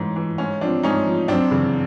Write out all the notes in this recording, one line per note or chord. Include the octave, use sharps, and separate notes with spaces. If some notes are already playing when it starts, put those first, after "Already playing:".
Already playing: G#2 E3 C#4
E3
G#2 C#4
F3 C4 D4
G#2 C#4 D#4
F3
F#2 C4 D4
C#3 E3